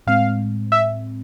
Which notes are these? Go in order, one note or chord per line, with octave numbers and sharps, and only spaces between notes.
A2 G#3 C4 F5
E5